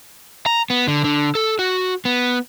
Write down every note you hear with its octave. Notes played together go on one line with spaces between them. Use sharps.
A#5
B3
D3
D3
A4
F#4
B3